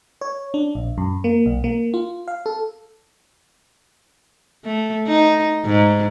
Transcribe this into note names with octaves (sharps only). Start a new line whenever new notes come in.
C#5
D4
A#1
F#2
A#3
B1
A#3
F4
F5
A4
A3
D#4
G#2